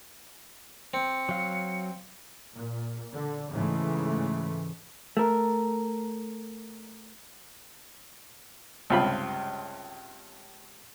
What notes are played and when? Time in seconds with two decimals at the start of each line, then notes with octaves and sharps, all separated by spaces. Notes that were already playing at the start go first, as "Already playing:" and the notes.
0.94 C4 C#7
1.29 F#3 F5
2.55 A#2
3.12 D3
3.50 G#2 C#3 E3 G#3 A3
5.17 A3 A#4
8.90 C#2 G2 C3 F4 B5